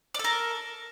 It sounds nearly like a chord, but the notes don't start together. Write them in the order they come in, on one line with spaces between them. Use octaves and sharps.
D5 A4 A#4